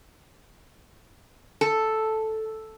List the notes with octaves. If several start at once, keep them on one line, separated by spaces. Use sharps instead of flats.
A4